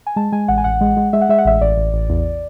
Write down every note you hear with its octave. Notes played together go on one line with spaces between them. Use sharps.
G#5
G#3 A5
G#3 G#5
A1 F#5
G#5
A1 F#5
G#3
G#3
G#3 E5
F#5
G#3 E5
F#5
A1 E5
A1 D5
A1
A1
E2